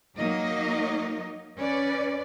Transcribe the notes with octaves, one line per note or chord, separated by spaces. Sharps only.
F#3 A#3 D#4 D#5
C#4 B4 D5